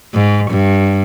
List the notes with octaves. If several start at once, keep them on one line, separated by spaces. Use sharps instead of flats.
G#2
G2